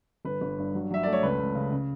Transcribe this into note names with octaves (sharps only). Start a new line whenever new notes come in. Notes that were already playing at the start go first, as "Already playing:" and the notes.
G1 B4
G1
G2
F#3
F#3 E5
A3 D5
C#5
C#2 B4
C#2
C#3
C#3